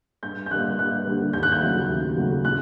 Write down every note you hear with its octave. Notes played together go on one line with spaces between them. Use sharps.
G2 G6
G6
D3 G3 A#3 F#6
G2 F#6
D3 G3 A#3
D#2 G6
F#6
G6
C#3 F#3 A3
D#2
C#3 F#3 A3
A2 F#6